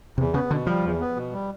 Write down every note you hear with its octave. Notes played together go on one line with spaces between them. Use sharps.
E2 C3
C#3 B3
B2 D3
F3 G3
E2
B3
B2
G3